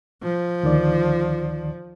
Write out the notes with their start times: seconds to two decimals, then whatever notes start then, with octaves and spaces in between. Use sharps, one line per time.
0.23 F3
0.63 D2 D#3 D5